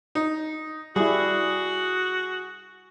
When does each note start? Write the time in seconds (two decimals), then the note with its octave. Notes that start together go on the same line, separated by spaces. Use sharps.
0.15 D#4
0.96 G3 E4 F#4 G#4